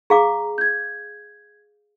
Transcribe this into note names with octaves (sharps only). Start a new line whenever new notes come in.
G#4 F5 A#5 D6
G6 G#6